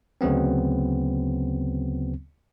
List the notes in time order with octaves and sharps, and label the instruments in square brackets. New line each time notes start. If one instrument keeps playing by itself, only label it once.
[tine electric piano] D2 C#3 F#3 B3 C4